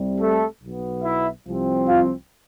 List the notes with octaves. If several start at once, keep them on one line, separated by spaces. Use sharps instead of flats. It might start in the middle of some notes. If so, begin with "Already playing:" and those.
Already playing: C2 C3 G3
A3 A4
B1 B2 B3
E4 E5
C2 C3 F3 C4
F4 F5